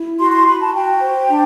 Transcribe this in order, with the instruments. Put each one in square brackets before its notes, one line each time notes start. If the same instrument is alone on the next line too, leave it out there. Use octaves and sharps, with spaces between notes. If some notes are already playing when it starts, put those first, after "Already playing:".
Already playing: [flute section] E4
F#4 C6
C6
F#4 B5
A5
F#4 G5
C5
D4